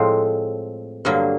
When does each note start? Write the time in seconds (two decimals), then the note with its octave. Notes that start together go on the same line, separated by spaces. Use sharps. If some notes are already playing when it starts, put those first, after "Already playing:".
Already playing: A2 F3 G#3 C4
1.05 G2 D3 F#3 A#3